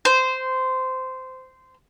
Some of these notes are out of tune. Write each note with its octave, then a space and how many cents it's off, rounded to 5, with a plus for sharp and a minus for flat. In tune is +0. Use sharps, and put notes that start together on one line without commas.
C5 -15